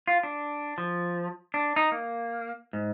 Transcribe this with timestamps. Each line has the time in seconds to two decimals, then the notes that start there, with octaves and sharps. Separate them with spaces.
0.07 F4
0.23 D4
0.78 F3
1.54 D4
1.76 D#4
1.92 A#3
2.73 G#2